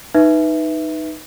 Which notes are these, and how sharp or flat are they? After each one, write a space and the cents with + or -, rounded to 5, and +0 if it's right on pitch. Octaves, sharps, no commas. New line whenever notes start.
D#4 +0 B4 +0 E5 +0